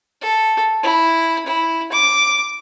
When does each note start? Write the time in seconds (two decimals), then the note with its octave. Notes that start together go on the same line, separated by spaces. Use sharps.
0.21 A4
0.83 E4
1.46 E4
1.92 D6